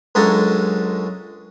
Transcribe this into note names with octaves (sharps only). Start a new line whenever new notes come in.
C#2 F#2 G#3 D4 A4 A#5